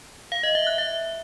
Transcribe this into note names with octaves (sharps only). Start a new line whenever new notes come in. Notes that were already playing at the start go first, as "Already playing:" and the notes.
F5
D#5
E5
F#6
E5